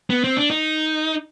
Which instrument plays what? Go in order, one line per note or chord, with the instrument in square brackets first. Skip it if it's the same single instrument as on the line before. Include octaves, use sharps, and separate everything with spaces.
[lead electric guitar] B3
C4
D4
D#4